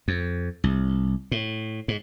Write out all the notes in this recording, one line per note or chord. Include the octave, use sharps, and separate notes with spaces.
F2
C2
A2
G#2